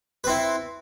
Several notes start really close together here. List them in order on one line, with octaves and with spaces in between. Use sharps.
B4 C4 E4